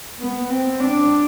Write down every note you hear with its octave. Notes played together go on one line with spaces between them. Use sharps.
B3
C4
D4